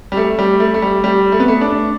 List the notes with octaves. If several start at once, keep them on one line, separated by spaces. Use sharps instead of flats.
G3
A3
G3
A3
A3
G3
G3
A3
B3
A3
D4